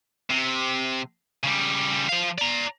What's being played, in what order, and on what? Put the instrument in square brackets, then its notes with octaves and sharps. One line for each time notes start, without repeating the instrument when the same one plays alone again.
[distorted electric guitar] C3
C#3 G3
F3 F5
D5 A#5